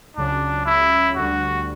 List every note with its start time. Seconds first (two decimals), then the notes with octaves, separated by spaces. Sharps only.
0.17 C#2 C#3 F#3 D4
0.66 E4
1.16 D2 D3 G3 F#4